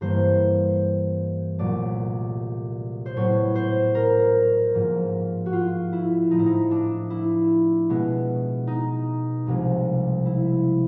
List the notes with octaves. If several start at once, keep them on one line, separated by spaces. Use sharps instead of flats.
G2 E3 G3 A#3 C5
C2 A#2 F#3 A3 D5
C5
A2 F#3 B3 C#5
C5
A#4
G#2 F3 A#3
F#4
F4
E4
A2 F3 A3 D#4
E4
D#4
D4
E4
B2 G#3 B3
D#4
C2 C3 F3 G#3
E4